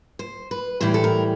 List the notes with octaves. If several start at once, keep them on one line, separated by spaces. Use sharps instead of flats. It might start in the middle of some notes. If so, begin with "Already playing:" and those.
C5
B4
A2 E3 G3 C5
A4
A#4